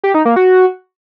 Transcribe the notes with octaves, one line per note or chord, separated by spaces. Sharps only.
G4
D#4
A#3
F#4